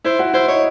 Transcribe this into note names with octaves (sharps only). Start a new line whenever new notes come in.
E4 C5
F#4
E4 C5
D#4 C#5